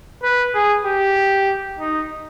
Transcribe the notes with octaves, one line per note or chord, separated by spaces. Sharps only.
B4
G#4
G4
D#4